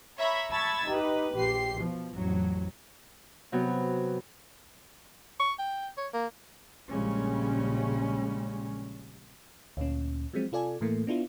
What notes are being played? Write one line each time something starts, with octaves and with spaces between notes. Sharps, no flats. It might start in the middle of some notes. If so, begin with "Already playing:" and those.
C#5 E5 A#5 B5
A5 B5 C#6 E6 G#6 A6
D#4 G4 B4
A#1 G4 C6 C7
B2 F3
A1 F2 F#3
C3 F#3 B3
C#6
G5
C#5
A#3
A#1 C#3 G3 G#3 C#4
D2 A#2 C#4
F3 F#3 G#3 C4
C3 F4 A4 D5 G#5
A2 E3 A3 A#3
B3 D4 E4 F4